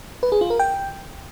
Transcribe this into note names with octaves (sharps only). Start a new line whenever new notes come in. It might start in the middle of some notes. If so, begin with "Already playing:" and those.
B4
G#4
F4
A#4
G5